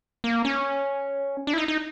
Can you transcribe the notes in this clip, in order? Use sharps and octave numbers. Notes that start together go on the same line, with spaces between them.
A#3
C#4
D4
E4
D#4
D#4